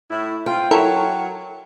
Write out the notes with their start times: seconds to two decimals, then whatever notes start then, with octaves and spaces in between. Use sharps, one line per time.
0.09 A2 E4
0.46 C4 F4 G5
0.71 F#3 E4 A4 A#4 C#5